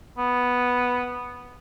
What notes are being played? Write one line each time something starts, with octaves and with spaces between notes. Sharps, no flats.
B3